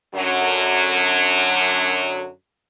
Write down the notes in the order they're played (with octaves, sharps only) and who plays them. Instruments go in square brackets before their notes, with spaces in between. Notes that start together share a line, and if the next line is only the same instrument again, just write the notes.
[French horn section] F#2 D3 F#3